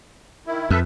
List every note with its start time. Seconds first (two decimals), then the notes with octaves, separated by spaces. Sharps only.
0.47 D#3 E4
0.70 F2 A4 B4 E5